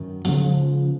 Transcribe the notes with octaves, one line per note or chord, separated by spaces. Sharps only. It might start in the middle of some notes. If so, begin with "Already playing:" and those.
Already playing: F#2 D#3 F#3
C#3 F3 G#3 B3